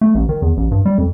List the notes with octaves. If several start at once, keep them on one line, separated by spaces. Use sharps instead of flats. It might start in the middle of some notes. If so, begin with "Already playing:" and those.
A3
A1
D#3
E2
A1
G2
G3
F2